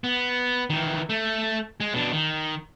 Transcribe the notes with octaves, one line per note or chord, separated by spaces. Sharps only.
B3
D#3 E3
A3
G#3
B2 D4
D#3